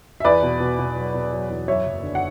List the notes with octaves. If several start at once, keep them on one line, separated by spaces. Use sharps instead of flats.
E5
E2 B4 D5
B2
B2
B2
F#3
B2
F#3
E2
F#2 C#5 E5
F#1
D3
F#5